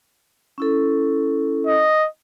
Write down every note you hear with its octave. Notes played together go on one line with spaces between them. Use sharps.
C#4 E4 A4
D#5